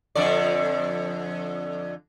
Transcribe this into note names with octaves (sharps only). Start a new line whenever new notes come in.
F2 D3 D5